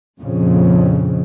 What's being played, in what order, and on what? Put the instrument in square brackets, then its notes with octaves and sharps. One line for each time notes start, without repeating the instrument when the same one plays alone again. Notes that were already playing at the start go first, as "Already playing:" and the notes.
[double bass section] A#1 F2 C#3 F3